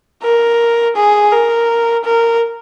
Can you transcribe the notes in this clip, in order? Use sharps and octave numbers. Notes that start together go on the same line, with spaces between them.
A#4
G#4
A#4
A#4